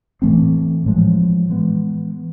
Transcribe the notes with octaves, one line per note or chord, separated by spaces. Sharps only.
A2 E3 A3 C4
A2 F3 G#3
E3 G#3 B3